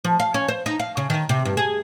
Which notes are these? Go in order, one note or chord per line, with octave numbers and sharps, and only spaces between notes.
F3
F5
C#4
C5
D#4
F5
C#3
D#3
C3
G2
G#4